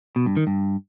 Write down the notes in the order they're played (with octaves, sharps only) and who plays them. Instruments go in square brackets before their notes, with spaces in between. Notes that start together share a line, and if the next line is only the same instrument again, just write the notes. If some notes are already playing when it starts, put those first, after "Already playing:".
[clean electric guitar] B2
G2
D#3
G2